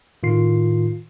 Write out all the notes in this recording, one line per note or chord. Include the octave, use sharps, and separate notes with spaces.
A2 D#3 F4 C7